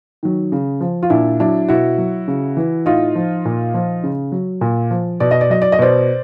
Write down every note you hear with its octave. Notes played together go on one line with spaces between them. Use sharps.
D#3 F#3
C#3
F3
F4
A#2 D4 E4
F#3 D4 E4
B2 E4 F#4
F#3
C#3
E3
A2 D#4 F4
F3
A#2
F3
C#3
F#3
A#2
F3
B2 D5
D#5
D5
F#3 D#5
D5
D#5
B2 C5 D5